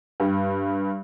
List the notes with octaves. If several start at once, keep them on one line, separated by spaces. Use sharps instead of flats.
G2